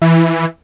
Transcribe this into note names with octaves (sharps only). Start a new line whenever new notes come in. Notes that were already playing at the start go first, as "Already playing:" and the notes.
E3